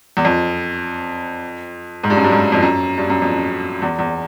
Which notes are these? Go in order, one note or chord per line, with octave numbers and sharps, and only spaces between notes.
E2
F2
G#2
G2
F#2
G2
G#2
F2
F#2
G2
F#2
F2
E2
E2